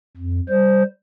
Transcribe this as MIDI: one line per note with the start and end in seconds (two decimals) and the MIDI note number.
0.17 0.40 41
0.49 0.83 55
0.49 0.83 72